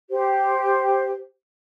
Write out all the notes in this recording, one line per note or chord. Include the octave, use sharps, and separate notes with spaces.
G4 C5